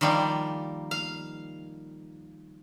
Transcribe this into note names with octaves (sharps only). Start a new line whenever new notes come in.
D#3 F3 G3 A#3
F5